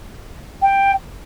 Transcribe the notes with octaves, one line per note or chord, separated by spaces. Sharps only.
G5